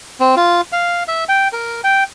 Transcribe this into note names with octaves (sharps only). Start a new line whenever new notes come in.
C4
F4
F5
E5
G5
A#4
G5